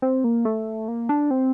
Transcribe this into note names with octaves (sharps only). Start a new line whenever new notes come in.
C4
A#3
A3
A#3
D4
C4